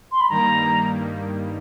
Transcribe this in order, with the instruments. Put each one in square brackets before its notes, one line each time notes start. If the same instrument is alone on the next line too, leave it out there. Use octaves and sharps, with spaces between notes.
[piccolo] C6
B5
[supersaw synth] G2 D#3 G3 A#3 [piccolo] A#5